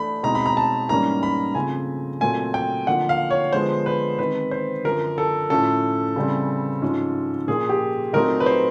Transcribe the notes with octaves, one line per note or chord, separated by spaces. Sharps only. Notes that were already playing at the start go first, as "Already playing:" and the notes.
Already playing: E3 A3 D4 B5
B2 G#3 C4 D#4 A#5
B5
A#5
A5
G#2 E3 G3 A#3 C#4 A#5
B5
C#3 F3 A3 C4 G#5
A#2 F#3 A3 C4 G#5
G5
D3 F3 A#3 D#4 F#5
F5
C#5
D3 F3 G#3 B3 C5
B4
D#3 G#3 C4 D#4 B4
C5
F#2 D3 F3 A#4
A4
A2 F3 A3 C#4 A4
C#3 E3 G3 C4
G#2 F3 G#3 C#4
A#2 F3 A#3 G#4
G4
A#2 F#3 A3 C4 D#4 A#4
B4
C5